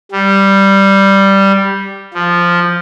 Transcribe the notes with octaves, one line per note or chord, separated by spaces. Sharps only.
G3
F3